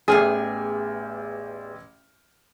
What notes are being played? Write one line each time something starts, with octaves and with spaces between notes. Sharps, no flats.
A1 E2 G4 G#4 F6